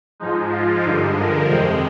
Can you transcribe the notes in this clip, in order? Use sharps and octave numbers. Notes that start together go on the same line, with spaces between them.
G#2 F3 G#3 D#4
F4
G2 D3 F3 G#3 D#4
A#4
F2 C3 D#3 G#3 C5